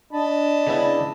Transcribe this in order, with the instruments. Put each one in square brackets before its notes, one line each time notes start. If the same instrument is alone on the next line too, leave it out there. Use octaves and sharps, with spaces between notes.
[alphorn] D4 [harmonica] D#5 A5 B5
[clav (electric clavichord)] C#3 B3 E4 [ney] D5